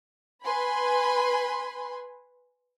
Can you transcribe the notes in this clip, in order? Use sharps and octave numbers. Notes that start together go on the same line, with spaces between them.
B4 G#5 B5 C6